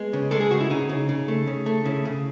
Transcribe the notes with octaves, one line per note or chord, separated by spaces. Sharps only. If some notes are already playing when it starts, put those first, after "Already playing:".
Already playing: G#3 B3
C#3
G#3 A4
G#4
C#3 F#4
E4
C#3 D#4
C#3
C#3
A3
C#3
A3
C#3 E4
C#3